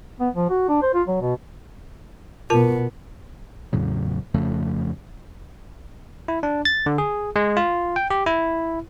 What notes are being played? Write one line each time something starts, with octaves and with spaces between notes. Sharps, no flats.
B3
F3
F#4
D4
C5
F4
F#3
B2
B2 B3 F4 A#4 A5
E2 A2 C#3 F#3
F2 C#3 F3 A3
E4
D4
A6
D3
G#4
G#3
F4
G5
G4
E4